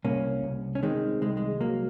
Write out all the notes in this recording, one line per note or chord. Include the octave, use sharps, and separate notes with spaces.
C2 A#3 C#4
C2
C#4
D#3 G#3 C4
C2 G#3
G#3
F#3 A#3